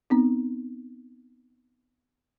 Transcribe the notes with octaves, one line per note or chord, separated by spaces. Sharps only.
B3 C4 D#4